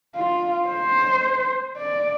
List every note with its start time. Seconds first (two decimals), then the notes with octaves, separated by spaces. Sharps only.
0.15 F4
0.69 C5
1.78 D5